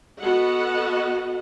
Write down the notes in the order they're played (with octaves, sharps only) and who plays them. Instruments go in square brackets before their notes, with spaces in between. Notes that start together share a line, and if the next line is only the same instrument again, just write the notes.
[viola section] B3 F#4 A4 D#5 F#5